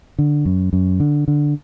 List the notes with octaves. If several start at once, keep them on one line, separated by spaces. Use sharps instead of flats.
D3
F#2
F#2
D3
D3